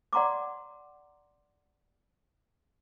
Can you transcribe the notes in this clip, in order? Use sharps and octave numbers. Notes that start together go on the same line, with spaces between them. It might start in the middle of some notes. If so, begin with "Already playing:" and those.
D5 F#5 A#5 C6 D6